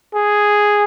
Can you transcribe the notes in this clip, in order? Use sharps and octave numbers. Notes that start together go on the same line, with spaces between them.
G#4